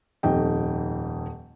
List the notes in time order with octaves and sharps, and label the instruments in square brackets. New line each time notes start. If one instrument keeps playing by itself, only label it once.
[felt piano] D#1 F2 G#2 D#5 G5